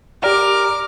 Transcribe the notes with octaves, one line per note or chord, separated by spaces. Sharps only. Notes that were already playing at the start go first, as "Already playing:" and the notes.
G4 A#4 D5 D6 F6